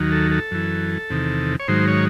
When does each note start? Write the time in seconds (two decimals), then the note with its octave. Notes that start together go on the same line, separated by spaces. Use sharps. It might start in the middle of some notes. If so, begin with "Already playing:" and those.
Already playing: D#2 D#3 F#3
0.12 A4
0.31 A4
0.51 F#2 E3
1.10 E2 C3 D#3
1.60 C#5
1.68 G#2 D#3 F#3 C5
1.88 C#5